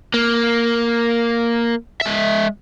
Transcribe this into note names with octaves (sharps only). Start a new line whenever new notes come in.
A#3
G#3 E5